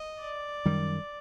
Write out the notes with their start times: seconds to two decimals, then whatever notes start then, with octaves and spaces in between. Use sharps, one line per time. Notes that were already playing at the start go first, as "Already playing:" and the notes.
Already playing: D#5
0.19 D5
0.65 F#2 D#3 G3